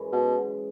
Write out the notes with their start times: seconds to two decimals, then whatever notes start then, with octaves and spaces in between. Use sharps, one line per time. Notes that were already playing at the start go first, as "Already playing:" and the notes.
Already playing: F#2 E3 G#3
0.12 B2